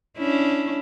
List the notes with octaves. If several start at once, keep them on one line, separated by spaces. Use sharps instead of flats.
C#4 D4 E4